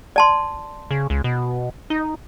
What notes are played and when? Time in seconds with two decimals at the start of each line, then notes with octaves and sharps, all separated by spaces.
0.16 D5 A5 C6
0.91 C#3
1.10 C#2
1.24 B2
1.90 D#4